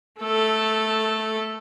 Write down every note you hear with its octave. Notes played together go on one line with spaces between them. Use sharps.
A3 A4